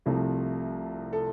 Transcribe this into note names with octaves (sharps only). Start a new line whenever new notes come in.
C2 C3 F3 A3
A4